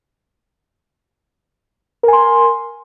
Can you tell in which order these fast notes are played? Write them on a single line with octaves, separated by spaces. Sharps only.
A#4 G#5 C6